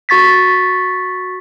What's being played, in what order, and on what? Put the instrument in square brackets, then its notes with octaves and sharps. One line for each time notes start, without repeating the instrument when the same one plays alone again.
[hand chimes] F#4 C#6 A6 B6